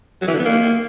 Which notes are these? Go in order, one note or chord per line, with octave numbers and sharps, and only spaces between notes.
F#3
E3
D3
B3
A#3